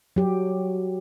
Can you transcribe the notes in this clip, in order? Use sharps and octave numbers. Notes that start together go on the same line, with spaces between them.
F#3 G4